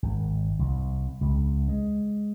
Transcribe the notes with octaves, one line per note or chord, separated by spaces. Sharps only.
G#1
C2
C#2
G#3